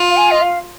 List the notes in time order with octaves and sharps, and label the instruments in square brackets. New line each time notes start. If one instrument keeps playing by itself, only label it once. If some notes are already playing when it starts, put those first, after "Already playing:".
Already playing: [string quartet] F4
[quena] F5
G#5
D#5
F5